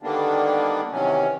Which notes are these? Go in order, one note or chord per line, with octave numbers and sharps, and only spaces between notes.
D3 D#3 G3 A#3 B3 D4
C3 D#3 E3 F#3 C#4